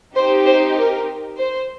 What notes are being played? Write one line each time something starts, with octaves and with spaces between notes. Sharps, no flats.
C4 D#4 G4 C5
C5
A#4
C5